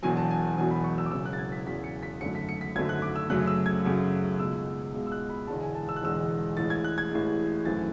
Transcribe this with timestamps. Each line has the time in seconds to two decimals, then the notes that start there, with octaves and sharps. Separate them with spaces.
0.03 E1 E2 B2 F#3 G#5
0.17 A5
0.31 G#5
0.57 E1 E2 B2 F#3 G#5
0.71 B5
0.84 C#6
0.98 E6
1.06 D6
1.11 E1 E2 C#3 F#3 E6
1.26 F#6
1.33 A6
1.38 G#6
1.52 B6
1.66 E1 E2 C#3 F#3 B6
1.84 C#7
2.03 B6
2.21 G#1 F#2 D3 F#3 A3 C#7
2.35 B6
2.49 C#7
2.61 B6
2.76 G#1 F#2 D3 F#3 A3 G#6
2.89 F#6
3.02 D6
3.16 E6
3.29 F#2 C#3 F#3 A3 F#6
3.47 E6
3.66 G#6
3.85 F#2 C#3 F#3 A3
4.39 C#2 B2 G#3 E6
4.94 C#2 B2 G#3
5.07 E6
5.12 F#6
5.30 B5
5.47 E1 E2 D3 G#3 A5
5.62 G#5
5.75 A5
5.89 E6
5.96 F#6
6.02 E1 E2 D3 G#3 E6
6.57 A1 A2 G#3 A6
6.70 G#6
6.84 F#6
6.98 G#6
7.11 A1 A2 G#3
7.65 G#1 F#2 E3 A3 A6